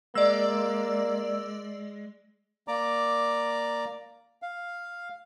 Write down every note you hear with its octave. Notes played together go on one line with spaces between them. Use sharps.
G#3 A#3 D5 E6
A#3 D5 A#5 D6
F5